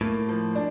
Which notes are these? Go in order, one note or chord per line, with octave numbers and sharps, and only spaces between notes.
A2 A#3
F3
D4